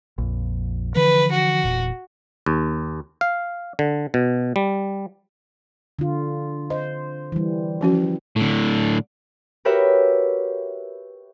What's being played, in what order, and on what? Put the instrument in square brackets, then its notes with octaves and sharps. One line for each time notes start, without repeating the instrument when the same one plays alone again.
[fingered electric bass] A#1 F2
[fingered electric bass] D3 E3 F3 [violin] B4
[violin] F#4
[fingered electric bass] E1 A#2
[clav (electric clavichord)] D#2
F5
D3
B2
G3
[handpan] D3 F4
[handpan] C5 [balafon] D#5
[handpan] E3 G3
[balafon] F3 C#4 F#4
[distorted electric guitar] A2 D3
[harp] F#4 G4 A#4 B4 C#5 E5